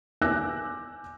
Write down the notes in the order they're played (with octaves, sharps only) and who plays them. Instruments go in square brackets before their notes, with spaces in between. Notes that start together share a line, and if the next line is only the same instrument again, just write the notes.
[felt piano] G#5 D6 E6 F#6 G6 A#6